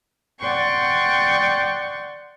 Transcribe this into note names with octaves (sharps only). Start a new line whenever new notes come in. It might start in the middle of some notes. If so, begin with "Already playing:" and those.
D5 F#5 G5 C6 C#6